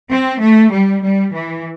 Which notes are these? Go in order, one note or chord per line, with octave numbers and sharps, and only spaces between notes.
C4
A3
G3
G3
E3